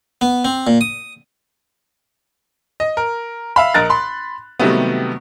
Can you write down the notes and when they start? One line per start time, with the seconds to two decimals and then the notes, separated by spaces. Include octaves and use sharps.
0.21 B3
0.45 C4
0.67 A#2
0.81 D#6
2.80 D#5
2.97 A#4
3.56 E5 F5 B5
3.74 A#1 A#4 D#5 F#6 A6
3.90 B5 C6
4.60 C3 D#3 F#3 G3 A3 B3